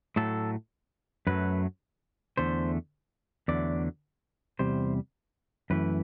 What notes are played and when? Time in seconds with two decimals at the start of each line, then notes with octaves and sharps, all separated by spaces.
0.16 A2 F#3 A3 A4
1.27 F#2 F#3 A3 B4
2.37 E2 D3 A3 C5
3.48 E2 D3 F#3 A3 D5
4.59 E2 C3 G3 C5
5.70 F#2 E3 A3 B4